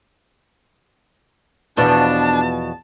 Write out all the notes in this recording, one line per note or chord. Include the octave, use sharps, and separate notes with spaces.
E2 B2 F3 D4 A5